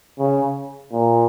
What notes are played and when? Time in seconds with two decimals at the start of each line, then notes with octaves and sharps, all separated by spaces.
0.19 C#3
0.92 A#2